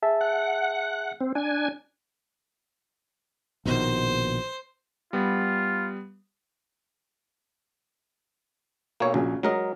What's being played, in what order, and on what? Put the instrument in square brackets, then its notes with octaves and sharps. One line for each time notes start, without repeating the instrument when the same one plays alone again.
[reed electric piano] G#4 E5 A5
[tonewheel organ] F#5
C4
D4 G#5
[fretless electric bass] A#1 B2 D#3 [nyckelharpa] C5
[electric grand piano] G3 B3 [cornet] F4
[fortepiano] B1 [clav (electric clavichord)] A#3 C#5
[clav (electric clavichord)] A#1 [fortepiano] A#2 C#3 F#3
[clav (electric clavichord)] F#3 A#4 D#5 [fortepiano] G#3